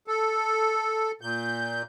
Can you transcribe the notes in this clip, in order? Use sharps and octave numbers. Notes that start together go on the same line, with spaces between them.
A4
A#2 G6